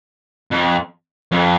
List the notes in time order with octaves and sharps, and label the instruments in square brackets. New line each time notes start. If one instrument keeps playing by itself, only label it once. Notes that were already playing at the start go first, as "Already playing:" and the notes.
[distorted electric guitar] F2
F2